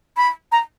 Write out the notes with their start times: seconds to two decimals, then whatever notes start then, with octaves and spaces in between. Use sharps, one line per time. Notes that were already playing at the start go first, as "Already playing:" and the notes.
0.17 B5
0.52 A#5